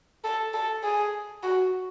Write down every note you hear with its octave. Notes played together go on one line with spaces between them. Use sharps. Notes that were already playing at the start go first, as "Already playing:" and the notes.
A4
A4
G#4
F#4